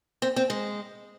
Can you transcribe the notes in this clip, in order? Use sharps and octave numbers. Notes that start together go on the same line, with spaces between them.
C4
C4
G#3